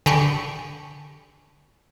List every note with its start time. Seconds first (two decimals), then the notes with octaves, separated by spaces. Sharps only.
0.06 D3 G4 G#4 B5 C#6